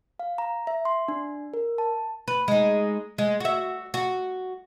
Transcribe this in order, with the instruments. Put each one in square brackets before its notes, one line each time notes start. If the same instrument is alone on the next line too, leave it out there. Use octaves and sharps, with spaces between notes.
[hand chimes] F5
A#5
E5
C6
D4
A#4
A5
[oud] B4
G#3 D#4
G#3
F#4 E5
F#4